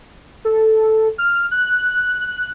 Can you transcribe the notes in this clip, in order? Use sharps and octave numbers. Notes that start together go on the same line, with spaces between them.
A4
F6
F#6